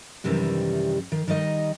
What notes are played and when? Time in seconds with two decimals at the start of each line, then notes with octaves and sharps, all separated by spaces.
0.24 F#2 C3 D#3 E3 G3
1.12 D#3
1.28 D#3 G3 D#4 D#5